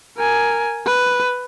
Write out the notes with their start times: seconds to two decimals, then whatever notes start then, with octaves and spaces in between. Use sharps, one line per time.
0.17 A#4 G#5
0.86 B4